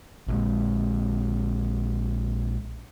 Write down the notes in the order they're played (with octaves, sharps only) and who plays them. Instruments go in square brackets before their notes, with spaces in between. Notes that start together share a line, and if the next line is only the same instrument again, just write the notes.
[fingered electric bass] A#1 G#3